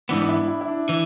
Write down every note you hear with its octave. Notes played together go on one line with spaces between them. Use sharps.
G#2 E3 B3 D4
E4
E4
E4
D4
E3